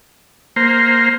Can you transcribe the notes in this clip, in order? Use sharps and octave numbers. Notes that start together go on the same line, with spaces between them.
A#3 C5